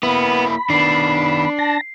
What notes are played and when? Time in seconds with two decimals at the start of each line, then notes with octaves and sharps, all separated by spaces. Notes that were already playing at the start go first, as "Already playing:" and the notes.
0.03 A#3 B3 E4 B5
0.70 D#3 B3 D4 C7
1.59 A5 A#6